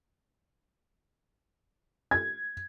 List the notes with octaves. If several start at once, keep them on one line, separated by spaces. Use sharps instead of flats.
G#6